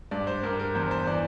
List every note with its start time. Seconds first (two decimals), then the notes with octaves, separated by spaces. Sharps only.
0.11 G2 D5
0.27 C5
0.43 G2 A#4
0.59 A#4
0.75 E2 C5
0.91 C5
1.07 E3 D5